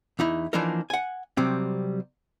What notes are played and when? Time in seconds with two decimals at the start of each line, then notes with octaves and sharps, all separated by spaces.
0.19 E2 D#4 E4
0.53 E3 F3 A#3 D4 D#4 A#4
0.90 F#5 G#5
1.37 C3 F#3 G3 C4